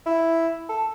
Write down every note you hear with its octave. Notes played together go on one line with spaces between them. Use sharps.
E4
A4